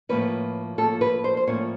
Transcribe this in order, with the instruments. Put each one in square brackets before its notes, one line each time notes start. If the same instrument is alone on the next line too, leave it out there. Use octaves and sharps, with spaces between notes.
[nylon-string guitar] A2 F3 A#3 C#4 B4
A2 F3 A#3 C#4 A4
B4
C5
C5
A2 F3 A#3 C#4 C#5